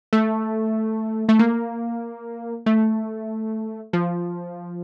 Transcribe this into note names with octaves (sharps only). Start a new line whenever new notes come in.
A3
A3
A#3
A3
F3